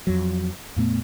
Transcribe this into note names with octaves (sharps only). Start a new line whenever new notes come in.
F2 F#3
F2 A#2 A3 B3